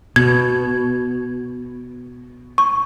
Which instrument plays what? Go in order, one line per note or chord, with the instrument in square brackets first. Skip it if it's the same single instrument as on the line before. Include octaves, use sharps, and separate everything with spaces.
[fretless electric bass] B2 [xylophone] G#6
[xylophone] C#6